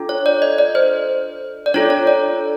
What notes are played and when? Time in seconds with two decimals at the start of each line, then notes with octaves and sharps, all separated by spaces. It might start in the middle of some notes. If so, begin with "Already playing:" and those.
Already playing: D4 F4 A4
0.09 C#5
0.26 D5
0.42 D#5
0.58 D5
0.75 C5
1.66 D5
1.74 D4 F4 A4 C#5
1.90 C#5
2.07 D5